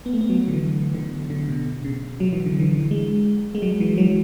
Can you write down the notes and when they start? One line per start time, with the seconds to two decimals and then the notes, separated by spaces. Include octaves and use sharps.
0.06 B3
0.13 A3
0.21 B3
0.29 F#3
0.48 D3
0.53 E3
0.95 D3
1.30 D3
1.49 B2
1.85 C#3
2.20 F#3
2.33 E3
2.46 D3
2.60 E3
2.91 G#3
3.55 G#3
3.62 F#3
3.80 E3
3.98 F#3